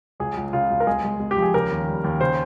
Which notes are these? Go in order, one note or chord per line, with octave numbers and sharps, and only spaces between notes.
C#2 G#4
C#2
C#3 F4
C#2
A#4
G#3 G#4
G#3
G#3
G4
F3
G#4
C#3 A#4
D#2
G3
D#2
C#3 C5